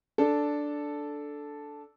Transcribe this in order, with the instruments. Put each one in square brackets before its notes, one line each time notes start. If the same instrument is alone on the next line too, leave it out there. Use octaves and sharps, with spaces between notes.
[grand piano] D4 A4